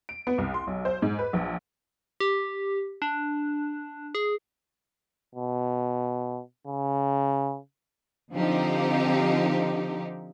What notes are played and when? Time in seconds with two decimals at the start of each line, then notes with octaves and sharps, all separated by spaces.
0.09 D7
0.27 B3
0.38 C2
0.54 C6
0.67 B1
0.85 C5
1.02 G#2
1.19 B4
1.33 A#1
2.20 G4
3.02 D4
4.15 G#4
5.35 B2
6.67 C#3
8.33 D3 F3 C4 D#4 G4